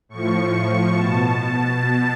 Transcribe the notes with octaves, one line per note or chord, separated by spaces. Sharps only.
A2 F3 C#6
B2 A5
B2